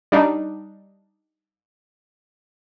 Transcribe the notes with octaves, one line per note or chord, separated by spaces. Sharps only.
G3 D4 D#4